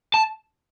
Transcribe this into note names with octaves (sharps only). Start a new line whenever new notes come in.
A5